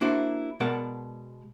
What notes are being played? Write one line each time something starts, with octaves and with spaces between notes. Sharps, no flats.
A#3 D4 E4 F#4 C5
B2 G#3 A#4 D5 F#5 A5